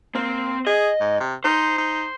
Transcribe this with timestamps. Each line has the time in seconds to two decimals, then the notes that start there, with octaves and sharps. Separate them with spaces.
0.15 A#3 C4
0.66 G#4 D#5
1.01 G#2
1.20 C3
1.44 D#4 C5
1.78 D#4